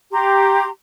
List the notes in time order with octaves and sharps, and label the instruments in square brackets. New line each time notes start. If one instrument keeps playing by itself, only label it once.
[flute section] G4 A#5 C6